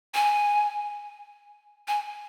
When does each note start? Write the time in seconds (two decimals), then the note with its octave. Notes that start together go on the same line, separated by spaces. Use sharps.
0.14 G#5
1.88 G#5